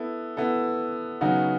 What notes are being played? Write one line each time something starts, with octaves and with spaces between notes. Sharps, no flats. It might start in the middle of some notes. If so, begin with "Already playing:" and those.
Already playing: B3 E4 A4
B3 E4 A4
C#3 F#3 B3 D#4 F#4